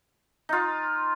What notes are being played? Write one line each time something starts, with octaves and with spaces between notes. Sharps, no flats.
D#4 F4